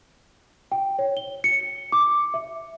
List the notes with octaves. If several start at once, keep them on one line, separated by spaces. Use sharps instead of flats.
G5
C#5
G7
C#7
D6
E5